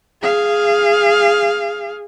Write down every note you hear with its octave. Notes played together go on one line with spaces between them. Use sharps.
G#4 F5